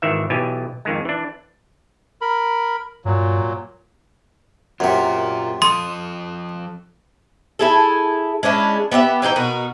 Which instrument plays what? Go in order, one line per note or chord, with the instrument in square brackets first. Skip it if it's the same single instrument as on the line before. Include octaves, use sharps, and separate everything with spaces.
[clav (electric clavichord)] G#1 D#3 E3 E5
B1 B2 E3 G4 G#5
F2 D#3 G#3
E3 D4
[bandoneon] A#4 B5
[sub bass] G2 [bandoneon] A#2 F#3
[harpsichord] F#2 C3 [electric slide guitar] F4 A#4
[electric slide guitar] F3 A4 [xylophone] C6 [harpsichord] D#6
[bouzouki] E4 G#4 A4
G#3 C#4 D4 E4
B3 G4 D#5 E5
E3 C4 D#4 G5
B2 D#4 F#4 A#4